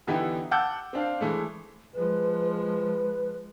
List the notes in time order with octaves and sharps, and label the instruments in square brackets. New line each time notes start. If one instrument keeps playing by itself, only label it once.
[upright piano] D3 E3 B3 D#4 E4 G4
F#5 A5 D6 E6 G6
C4 D4 F5
E3 G#3 A3
[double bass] F3 G#3 [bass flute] B4
[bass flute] B4